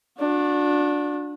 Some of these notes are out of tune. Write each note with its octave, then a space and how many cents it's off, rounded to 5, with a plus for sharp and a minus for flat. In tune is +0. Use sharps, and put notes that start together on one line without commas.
D4 +0 F#4 -35